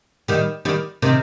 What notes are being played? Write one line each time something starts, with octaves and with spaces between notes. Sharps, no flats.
D#3 G3
D#3 G3
C3 D#3